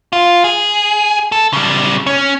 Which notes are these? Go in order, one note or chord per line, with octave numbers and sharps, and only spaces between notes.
F4
G#4
A4
C#3 G3
C#4